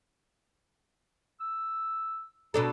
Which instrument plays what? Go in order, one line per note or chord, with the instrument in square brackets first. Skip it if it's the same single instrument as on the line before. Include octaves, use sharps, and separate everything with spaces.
[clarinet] E6
[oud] B2 D4 A4 [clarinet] A#5